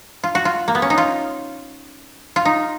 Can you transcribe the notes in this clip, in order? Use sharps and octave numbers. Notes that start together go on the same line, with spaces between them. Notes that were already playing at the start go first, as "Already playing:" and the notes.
F4
F#4
F4
A#3
B3
C#4
D#4
F4
F4
D#4